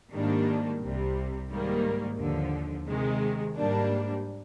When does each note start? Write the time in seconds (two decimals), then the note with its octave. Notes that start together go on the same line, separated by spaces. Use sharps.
0.13 G#2 D#3 G3 A#3 D4
0.82 C2 C3 G3
1.50 G#2 D#3 G3 A#3
2.19 D#2 D3 F3
2.87 C3 D#3 G#3
3.55 G#2 G3 A#3 D4